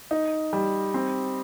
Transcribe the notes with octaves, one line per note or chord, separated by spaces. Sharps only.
D#4
G3
C4